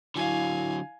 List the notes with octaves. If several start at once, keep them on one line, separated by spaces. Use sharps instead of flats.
D3 F#3 E4 F5 G#5